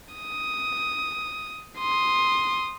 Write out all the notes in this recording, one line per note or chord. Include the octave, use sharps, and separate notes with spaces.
D#6
C6 D#6